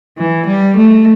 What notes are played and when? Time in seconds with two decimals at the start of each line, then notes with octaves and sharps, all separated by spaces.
0.18 E3
0.47 G3
0.77 A3